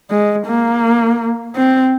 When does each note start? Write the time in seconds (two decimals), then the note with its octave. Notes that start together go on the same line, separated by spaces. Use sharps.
0.10 G#3
0.46 A#3
1.56 C4